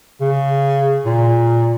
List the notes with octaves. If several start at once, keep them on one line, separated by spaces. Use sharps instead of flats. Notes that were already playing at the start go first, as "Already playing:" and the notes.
C#3
A#2